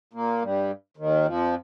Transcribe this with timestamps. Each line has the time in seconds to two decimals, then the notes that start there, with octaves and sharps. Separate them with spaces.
0.13 A#2 A#3
0.42 G2 G3
0.97 D#2 D#3
1.25 F2 F3